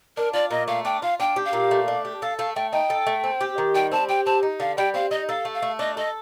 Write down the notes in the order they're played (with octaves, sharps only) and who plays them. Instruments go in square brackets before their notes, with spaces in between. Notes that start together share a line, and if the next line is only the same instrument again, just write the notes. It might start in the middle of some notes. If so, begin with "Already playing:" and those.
[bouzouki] D4 [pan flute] A#4
[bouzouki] F4 [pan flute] D5
[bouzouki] A#2 [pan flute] D#5
[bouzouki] A3 [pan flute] F5
[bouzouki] D4 [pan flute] G5
[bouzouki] F4 [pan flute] F5
[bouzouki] D4 [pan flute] G5
[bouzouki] G4
[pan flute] F5
[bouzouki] A#2
A3
D4
G4
[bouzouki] A4 [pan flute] F5
[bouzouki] A3 [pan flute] F5
[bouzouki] A3 [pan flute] G5
[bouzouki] D#4 [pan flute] G5
[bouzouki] A4
A3
C4
G4
D#3
[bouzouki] G3 [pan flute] G5
[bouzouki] C4 [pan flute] A5
[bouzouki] G4 [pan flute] G5
[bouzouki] C4 [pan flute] A5
[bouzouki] D#4
[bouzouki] D3 [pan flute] F5
[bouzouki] G3 [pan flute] G5
[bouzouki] C4 [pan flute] F5
[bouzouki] D#4 [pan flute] D#5
[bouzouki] A4 [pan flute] F5
[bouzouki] A3
[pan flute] F5
[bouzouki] A3
[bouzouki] D4 [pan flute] D#5
[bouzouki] A4 [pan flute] D#5